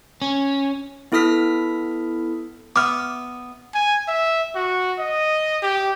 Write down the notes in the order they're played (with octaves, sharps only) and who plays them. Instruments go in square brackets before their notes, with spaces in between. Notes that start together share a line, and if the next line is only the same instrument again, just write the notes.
[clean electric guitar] C#4
[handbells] B3 E4 A4 D#6 F6 B6
[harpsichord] B3 E5 [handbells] D6 F6
[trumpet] G#5
E5
F#4
D#5
G4